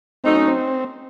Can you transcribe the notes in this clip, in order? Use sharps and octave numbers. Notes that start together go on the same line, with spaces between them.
F#3 A3 C4 D#4
C#4
C4